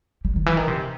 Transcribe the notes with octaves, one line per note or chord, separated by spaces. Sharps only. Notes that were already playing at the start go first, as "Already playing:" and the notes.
G3
D#3
E3
D#3
C3